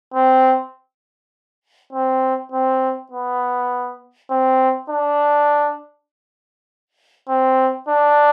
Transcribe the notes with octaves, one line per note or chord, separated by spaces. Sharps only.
C4
C4
C4
B3
C4
D4
C4
D4